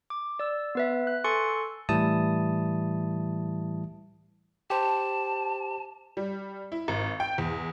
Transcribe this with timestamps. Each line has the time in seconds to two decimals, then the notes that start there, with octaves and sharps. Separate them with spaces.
0.10 D6
0.39 D5 E6
0.75 B3 B4 E5
1.07 F#6
1.24 A4 G#5 C6 C#6 A6 C#7
1.47 E6
1.89 A2 E3 G3 E4 A5 D#6
4.70 G4 C5 A5
6.17 G3
6.72 E4
6.88 G#1
7.20 G5
7.38 E2